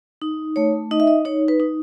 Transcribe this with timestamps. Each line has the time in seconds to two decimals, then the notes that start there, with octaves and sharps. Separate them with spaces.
0.22 D#4
0.56 A3 C#5
0.91 D#4 D#5
1.00 E5
1.07 D#5
1.25 D#4 C#5
1.48 B4
1.60 D#4